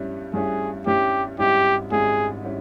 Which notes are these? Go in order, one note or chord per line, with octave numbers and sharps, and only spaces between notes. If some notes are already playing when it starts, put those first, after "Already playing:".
Already playing: G2 G3 C#4 E4
G2 G3 C#4 E4 G#4
G2 G3 C#4 E4 G4
G#1 G#2 G3 C#4 E4 G4
G#1 G#2 G3 C#4 E4 G#4
G3 C#4 E4